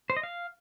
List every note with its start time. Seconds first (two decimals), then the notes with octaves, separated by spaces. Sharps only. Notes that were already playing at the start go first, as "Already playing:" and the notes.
0.10 C5
0.17 D#5
0.23 F5